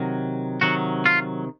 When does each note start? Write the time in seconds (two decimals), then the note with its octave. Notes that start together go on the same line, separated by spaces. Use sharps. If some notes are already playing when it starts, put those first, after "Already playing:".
Already playing: C3 D#3 F#3
0.61 C3 D#3 F#3 F#4
1.06 F4